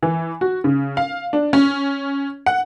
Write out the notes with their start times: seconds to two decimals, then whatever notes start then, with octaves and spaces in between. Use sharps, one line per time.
0.03 E3
0.41 F#4
0.64 C#3
0.97 F5
1.33 D4
1.53 C#4
2.46 F#5